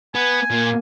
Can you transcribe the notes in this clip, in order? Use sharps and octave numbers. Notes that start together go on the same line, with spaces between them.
B3 G#5
A#2 A#3